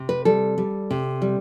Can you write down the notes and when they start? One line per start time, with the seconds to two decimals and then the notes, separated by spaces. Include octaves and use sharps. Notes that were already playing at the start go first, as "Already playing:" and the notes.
Already playing: C3
0.09 B4
0.25 G3 A4
0.58 G3
0.90 C3
1.22 G3